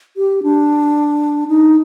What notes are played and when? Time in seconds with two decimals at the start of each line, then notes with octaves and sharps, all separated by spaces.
0.17 G4
0.43 D4
1.48 D#4